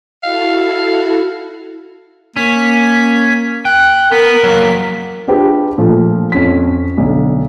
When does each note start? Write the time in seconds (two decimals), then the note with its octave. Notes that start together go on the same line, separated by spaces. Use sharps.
0.23 E4 F#4 A4 F5
2.36 A#3 C#4 B6
3.65 G5 F#6
4.12 B3 A#4 B6
4.44 F#3 A#3
5.28 D4 F4 G4 G#4 B4
5.78 A#2 F3 A3
6.32 F2 C#4 B6
6.98 B1 D3